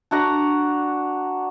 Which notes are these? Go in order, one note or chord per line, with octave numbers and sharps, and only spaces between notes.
D4 F#4 F#5 A#5